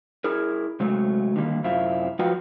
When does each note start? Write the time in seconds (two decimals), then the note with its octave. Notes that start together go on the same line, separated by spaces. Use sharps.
0.24 E4 G#4 A#4
0.80 C3 F#3 G#3 A3
1.36 D3 D#3 G3 A#3
1.64 F#2 C3 C4 E4 F4
2.19 F3 F4 F#4 B4 G5